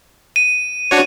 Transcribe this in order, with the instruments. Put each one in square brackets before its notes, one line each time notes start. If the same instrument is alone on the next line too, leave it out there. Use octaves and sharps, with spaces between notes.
[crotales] D#7
[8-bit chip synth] D4 F#4 C#5